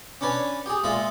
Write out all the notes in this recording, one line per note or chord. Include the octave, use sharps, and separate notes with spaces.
C#4 D4 B4 C#5 G#5
G4 G#4
A#2 G#3 F4 G#4 E5